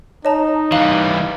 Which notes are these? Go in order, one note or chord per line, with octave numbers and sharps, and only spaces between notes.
D#4 C#5 D#5 A5 A#5
E3 G3 F5 F#6